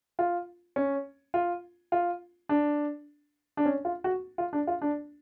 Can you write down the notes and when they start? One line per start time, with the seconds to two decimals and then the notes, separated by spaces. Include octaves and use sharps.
0.19 F4
0.76 C#4
1.34 F4
1.92 F4
2.49 D4
3.57 D4
3.66 C#4
3.85 F4
4.04 F#4
4.38 F4
4.53 D4
4.67 F4
4.82 D4